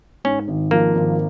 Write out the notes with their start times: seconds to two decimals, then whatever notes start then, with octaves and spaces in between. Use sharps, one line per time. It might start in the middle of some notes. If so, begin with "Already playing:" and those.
0.24 G#2 C#4
0.48 G#1
0.71 F3 A#3
0.95 G#1